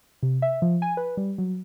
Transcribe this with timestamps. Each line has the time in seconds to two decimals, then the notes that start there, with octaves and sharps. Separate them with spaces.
0.23 C3
0.42 E5
0.62 F3
0.82 G#5
0.97 B4
1.17 G3
1.38 F#3